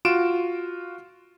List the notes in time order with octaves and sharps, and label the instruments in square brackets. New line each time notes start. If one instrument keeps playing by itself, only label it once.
[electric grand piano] F4 F#4 D7 E7